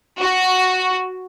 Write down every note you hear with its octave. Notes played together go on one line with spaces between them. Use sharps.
F#4